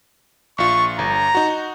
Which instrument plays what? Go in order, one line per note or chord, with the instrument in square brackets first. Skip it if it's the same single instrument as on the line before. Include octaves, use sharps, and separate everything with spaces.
[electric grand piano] A#1 F4 [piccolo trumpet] C#6
[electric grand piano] G1 [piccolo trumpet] A#5
[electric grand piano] D#4 F#4